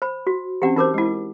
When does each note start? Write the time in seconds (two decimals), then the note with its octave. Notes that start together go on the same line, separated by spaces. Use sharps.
0.02 C5 B5
0.27 F#4
0.62 E3 C4 C#4 G4 F#5
0.77 E3 D#4 A#4 C5 D6
0.94 G#3 E4